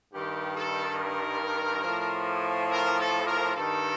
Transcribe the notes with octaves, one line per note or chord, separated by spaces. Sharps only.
G2 D#3 G4
A4
A#4
A2 F3
A#4
A4
A#4
G2 D#3 A4